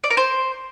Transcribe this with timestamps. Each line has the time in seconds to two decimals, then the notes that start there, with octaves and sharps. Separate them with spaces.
0.04 D5
0.10 A#4
0.17 C5